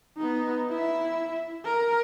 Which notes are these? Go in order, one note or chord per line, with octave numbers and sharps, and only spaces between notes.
B3 D#4
E4 E5
A#4